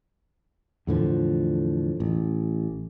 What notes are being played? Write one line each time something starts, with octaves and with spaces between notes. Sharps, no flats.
E2 A2 D3 F3
A1